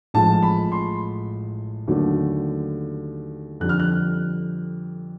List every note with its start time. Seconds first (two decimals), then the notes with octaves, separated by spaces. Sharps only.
0.14 A1 A2 F3 G#3 A5
0.42 B5
0.72 C6
1.87 D#2 D3 F#3 A3
3.60 F2 D3 G3 F#6
3.69 F6
3.80 F#6